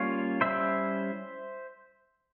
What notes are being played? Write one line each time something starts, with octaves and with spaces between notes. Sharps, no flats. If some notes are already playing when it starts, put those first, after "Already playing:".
Already playing: G3 A#3 C#4 F4 C#5 F5
G3 C#4 E4 C5 E5